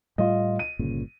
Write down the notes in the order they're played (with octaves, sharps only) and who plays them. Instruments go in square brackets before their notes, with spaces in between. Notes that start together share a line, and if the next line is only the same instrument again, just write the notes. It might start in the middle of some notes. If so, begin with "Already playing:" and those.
[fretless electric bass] A2 G3 A3 [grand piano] F4 D#5
[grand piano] D#7
[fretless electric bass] G1 A#2 C#3